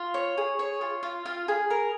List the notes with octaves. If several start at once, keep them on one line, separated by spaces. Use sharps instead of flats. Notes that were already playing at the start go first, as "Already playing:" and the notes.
Already playing: F4
C#5
G#4
C#5
F4
F4
F4
G#4
A#4